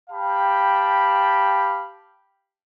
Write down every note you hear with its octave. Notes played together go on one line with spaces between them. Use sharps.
G4 F5 G5 A5 B5